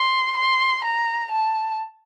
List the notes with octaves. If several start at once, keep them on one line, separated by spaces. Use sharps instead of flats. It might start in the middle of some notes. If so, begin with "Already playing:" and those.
Already playing: C6
C6
A#5
A5